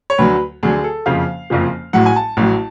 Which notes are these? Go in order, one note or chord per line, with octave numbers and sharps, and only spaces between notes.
C#5
D2 D3 F#3 B4
D2 D3 F#3 G#4
A4
F#1 F2 C#3 F3 F5
F#1 F2 C#3 F3
A1 A2 F#3 F#5
G#5
A5
A1 A2 F#3